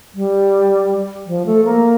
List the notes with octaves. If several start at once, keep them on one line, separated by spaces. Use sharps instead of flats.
G3
F3
A3
A#3